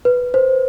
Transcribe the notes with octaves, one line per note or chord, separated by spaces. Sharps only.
B4
C5